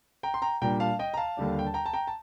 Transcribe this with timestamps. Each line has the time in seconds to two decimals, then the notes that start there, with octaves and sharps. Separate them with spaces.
0.23 G5 A#5
0.34 C6
0.42 G5 A#5
0.62 A#2 G3 D4 G5 A#5
0.80 F5 A5
0.99 D#5 G5
1.14 A#5
1.17 F5 A5
1.37 D#2 D3 G3 D4
1.59 G5
1.67 A5
1.74 G5 A#5
1.86 A5
1.93 G5 A#5
2.07 A5